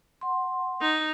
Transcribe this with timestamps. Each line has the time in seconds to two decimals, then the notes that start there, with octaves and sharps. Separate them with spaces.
0.21 F#5 C6
0.81 D#4